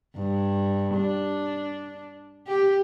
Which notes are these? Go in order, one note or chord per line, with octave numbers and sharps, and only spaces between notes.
G2
D4
G4